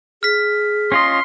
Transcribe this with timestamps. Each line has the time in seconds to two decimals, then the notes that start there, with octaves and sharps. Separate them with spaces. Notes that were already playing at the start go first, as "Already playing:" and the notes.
0.23 G#4 F6 B6
0.92 C#4 F4 D#5 C6